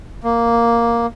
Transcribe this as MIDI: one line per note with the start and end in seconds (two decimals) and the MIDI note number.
0.24 1.06 58